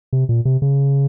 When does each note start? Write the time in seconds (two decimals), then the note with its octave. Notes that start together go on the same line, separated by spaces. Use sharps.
0.13 C3
0.29 A#2
0.45 C3
0.62 C#3